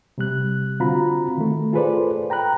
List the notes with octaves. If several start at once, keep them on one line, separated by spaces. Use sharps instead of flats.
C3 G3 F#6
D3 C4 F4 F#4 A#5 B5
D#3 A3
F4 G#4 A4 B4 C5 D5
G5 A#5 B5 F#6